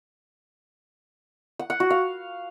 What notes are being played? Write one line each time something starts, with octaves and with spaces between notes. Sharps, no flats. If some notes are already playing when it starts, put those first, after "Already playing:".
F#5
F#5
F#4
F5